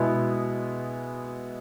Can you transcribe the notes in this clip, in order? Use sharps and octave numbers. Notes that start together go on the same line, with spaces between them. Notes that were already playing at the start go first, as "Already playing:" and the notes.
Already playing: B2 G#3 B3 E4